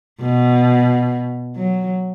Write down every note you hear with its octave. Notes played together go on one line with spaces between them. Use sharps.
B2
F#3